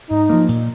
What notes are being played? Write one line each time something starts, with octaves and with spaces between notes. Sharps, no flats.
G#2 D#4
F3 A#3
A#2